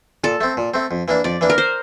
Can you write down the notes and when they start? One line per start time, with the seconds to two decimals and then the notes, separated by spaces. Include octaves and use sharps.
0.24 A#2 A4
0.41 A3 C4
0.57 A#2
0.74 A3 C4
0.91 F2
1.08 E3 A#3 D4
1.24 F2 D5
1.41 E3 A#3 D4
1.50 A#4
1.58 C5